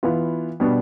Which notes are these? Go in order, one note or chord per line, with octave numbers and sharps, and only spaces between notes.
E3 B3 F4
B2 G3 B3 D4